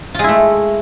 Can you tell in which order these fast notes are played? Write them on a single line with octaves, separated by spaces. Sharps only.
F4 G#3 E4 A3